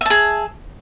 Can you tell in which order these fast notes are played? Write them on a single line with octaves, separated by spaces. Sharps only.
E5 A5 G#4